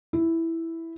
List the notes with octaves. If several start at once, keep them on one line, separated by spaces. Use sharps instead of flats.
E4